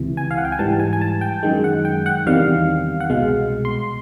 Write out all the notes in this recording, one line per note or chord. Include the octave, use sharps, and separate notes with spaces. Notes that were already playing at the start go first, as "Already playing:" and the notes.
Already playing: C#2 C3 E3
G#5
F5
F#5
G5
G#5
G#2 E3 G3 A5
G#5
G#5
A5
G5
F#2 D#3 G#3
F#5
G5
F#5
E2 C3 D#3 G3 F5
F#5
C2 B2 G#3 F5
C6